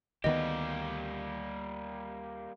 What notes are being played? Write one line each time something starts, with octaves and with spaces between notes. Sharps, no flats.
D2 D#3 G3 A#3 B3 G4 D#5